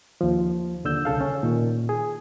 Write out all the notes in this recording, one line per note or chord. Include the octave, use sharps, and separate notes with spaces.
D#2 F3
D#2 D3 E6 G6
C2 C#3 A4 F5
C#4
A#2 D#3
G#4